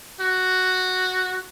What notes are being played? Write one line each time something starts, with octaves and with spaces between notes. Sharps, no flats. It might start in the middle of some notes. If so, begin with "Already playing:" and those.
F#4